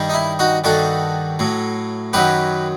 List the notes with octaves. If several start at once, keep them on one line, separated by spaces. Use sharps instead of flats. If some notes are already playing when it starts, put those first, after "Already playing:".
Already playing: G2 D#3 G3
D#4
E4
D#4 F#4
G2 D#3 G3 F#4 A4
A2 F#3
F#2 D#3 F#3 G4 B4